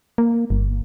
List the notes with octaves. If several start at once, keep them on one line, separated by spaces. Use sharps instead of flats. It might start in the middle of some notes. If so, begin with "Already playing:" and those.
A#3
G1